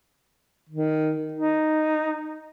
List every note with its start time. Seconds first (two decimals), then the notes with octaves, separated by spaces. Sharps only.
0.69 D#3
1.33 D#4